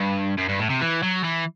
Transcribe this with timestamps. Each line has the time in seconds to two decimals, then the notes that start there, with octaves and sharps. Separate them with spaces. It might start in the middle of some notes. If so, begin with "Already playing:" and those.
Already playing: G2
0.38 F#2
0.49 G2
0.59 A2
0.70 C3
0.81 E3
1.03 F#3
1.24 E3